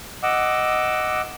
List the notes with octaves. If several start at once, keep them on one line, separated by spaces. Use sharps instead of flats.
D#5 F#5 D6 E6